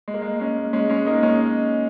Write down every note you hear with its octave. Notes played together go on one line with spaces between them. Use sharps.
G#3
A#3
G#3
G#3 C#4
G#3 C#4
G#3 C#4
A#3 D#4
G#3 C#4